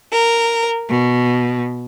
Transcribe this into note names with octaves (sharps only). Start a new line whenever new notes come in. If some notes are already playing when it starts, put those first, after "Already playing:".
A#4
B2